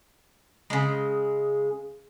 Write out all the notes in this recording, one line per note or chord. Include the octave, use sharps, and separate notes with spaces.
C#3 G#3